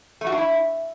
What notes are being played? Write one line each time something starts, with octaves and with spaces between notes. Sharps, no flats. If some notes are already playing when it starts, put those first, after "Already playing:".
A3
F#4
D4
E4